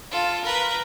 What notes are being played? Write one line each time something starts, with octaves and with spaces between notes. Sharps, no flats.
F4 A4
A#4 B4